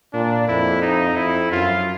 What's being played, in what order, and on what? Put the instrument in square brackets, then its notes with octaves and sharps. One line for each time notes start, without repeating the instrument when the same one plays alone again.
[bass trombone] A#2 [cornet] D4
[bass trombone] F2 [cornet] E4
[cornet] D#4
[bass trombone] F2 [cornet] E4
[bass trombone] F#2 [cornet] F4